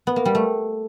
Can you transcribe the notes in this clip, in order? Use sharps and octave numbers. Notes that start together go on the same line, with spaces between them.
B3
A#3
G3
A3